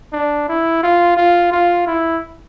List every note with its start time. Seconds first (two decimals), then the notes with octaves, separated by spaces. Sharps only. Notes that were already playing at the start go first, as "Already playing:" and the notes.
0.12 D4
0.48 E4
0.83 F4
1.17 F4
1.52 F4
1.87 E4